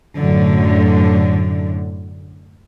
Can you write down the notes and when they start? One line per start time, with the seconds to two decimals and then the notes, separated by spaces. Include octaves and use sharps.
0.17 F#2 A2 D3